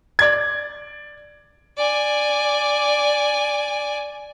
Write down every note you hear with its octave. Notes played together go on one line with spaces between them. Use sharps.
D5 G#6
D5 G#5